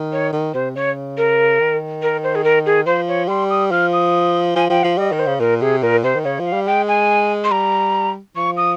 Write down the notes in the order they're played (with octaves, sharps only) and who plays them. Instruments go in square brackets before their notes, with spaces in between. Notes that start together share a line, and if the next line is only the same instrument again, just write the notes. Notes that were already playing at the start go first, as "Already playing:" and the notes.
Already playing: [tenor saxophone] D#3
[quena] C#5
[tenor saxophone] D#3
[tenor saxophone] C3 [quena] C5
[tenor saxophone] C#3 [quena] C#5
[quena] A#4
[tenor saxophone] D#3
[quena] A#4
C5
G#4
A#4
G#4
[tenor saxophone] F3 [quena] C5
[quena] C#5
[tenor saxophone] G3 [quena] C6
[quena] D#6
[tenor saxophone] F3 [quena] F6
[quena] D#6
[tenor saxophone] F3 [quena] G#5
[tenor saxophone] F3 [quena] G5
[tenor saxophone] F3 [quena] F5
[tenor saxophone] G3 [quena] D#5
[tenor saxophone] D#3 [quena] A#4
[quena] C5
[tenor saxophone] C#3
[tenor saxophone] A#2 [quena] A#4
[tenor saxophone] C3 [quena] G#4
[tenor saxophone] A#2 [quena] A#4
[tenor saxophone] C3 [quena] C5
[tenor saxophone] D#3
[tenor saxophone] C#3 [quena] C#5
[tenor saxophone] F3
[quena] F5
[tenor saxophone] G3
[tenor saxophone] G#3 [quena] G5
[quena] G#5
C6
[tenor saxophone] G3 [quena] A#5
[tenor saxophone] F3 [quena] C#6
[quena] D#6